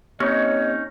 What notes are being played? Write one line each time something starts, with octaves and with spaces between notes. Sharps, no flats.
A#3 C4 C#4 D#4 G4 C#5 D#5